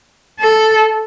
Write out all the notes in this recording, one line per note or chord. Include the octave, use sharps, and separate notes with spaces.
A4